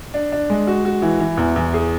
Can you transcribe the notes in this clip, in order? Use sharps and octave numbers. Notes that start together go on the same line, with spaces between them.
D4
D4
G#3
F#4
F#4
E3
E3
E2
E2
G#4